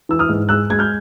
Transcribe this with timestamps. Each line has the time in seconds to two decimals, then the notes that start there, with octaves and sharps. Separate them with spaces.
0.09 E3 E6
0.19 D#6 F6
0.29 G#2
0.49 G#3 E6 F#6
0.70 G#3 G#6
0.79 F6 G6